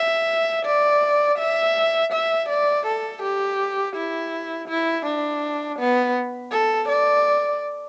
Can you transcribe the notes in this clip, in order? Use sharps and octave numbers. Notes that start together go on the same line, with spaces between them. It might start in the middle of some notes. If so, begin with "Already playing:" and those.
Already playing: E5
D5
E5
E5
D5
A4
G4
E4
E4
D4
B3
A4
D5